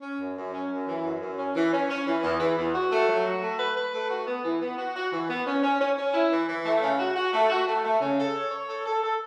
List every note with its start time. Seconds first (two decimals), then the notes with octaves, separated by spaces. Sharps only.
0.02 C#4
0.19 F#2
0.36 F#2
0.53 C#4
0.70 F#2
0.87 E3
1.04 F#2
1.21 F#2
1.38 C#4
1.55 E3
1.72 C#4
1.89 C#4
2.06 E3
2.23 E2
2.40 E3
2.57 E2
2.74 F#4
2.91 A3
3.08 F#3
3.25 F#4
3.42 A3
3.59 B4
3.76 B4
3.93 A3
4.10 F#4
4.27 B3
4.44 E3
4.61 B3
4.78 F#4
4.95 F#4
5.12 E3
5.29 B3
5.46 C#4
5.63 C#4
5.80 C#4
5.97 C#4
6.14 E4
6.31 E3
6.47 E3
6.65 A3
6.82 C#3
6.99 F#4
7.16 F#4
7.33 A3
7.50 F#4
7.67 A3
7.84 A3
8.01 C#3
8.17 A4
8.35 C#5
8.51 C#5
8.68 A4
8.86 A4
9.03 A4